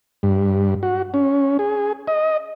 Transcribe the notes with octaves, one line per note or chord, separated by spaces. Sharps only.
G2
F#4
C#4
G#4
D#5